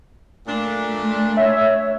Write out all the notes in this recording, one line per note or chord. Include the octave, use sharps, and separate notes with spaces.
A#2 A3 D4
C#5 E5